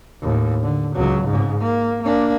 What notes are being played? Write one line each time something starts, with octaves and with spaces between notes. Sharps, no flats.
D#2 A2
D3
C#2 F#3
G#2 C#3
A#3
A#3 D4